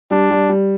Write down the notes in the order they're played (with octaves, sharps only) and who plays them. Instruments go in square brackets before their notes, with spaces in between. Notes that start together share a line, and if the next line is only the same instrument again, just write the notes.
[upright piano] G3 [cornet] D4
[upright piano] G3
G3